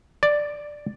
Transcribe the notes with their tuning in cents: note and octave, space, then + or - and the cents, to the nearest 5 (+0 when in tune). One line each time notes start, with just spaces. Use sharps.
D5 +5